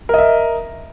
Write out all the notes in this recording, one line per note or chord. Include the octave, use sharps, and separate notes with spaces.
A#4 D#5 E5